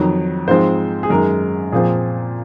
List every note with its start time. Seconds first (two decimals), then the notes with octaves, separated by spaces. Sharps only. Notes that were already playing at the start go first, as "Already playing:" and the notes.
Already playing: F2 D#3 F#3
0.48 G#2 F3 G#3 C4 C5
1.03 G#4
1.10 F#2 D#3 G#3 A#4
1.72 A#2 F3 C4 G#4